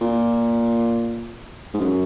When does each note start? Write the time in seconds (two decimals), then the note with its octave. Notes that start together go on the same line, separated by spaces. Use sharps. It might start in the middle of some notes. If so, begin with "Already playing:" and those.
0.02 A#2
1.74 G#2
1.80 F#2